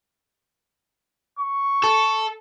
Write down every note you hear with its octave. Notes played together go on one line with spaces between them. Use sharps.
C#6
A4